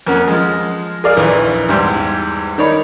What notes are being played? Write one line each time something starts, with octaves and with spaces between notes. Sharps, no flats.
F2 A#3 C#4 F#5
F3 G#3
G#4 A#4 D5 F5
A#1 D#2 E3
E2 G#2 G3 C6
D#3 D#4 C#5 D5 B5